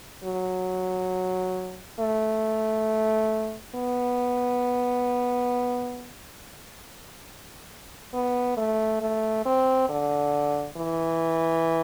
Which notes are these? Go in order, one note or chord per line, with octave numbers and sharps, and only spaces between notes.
F#3
A3
B3
B3
A3
A3
C4
D3
E3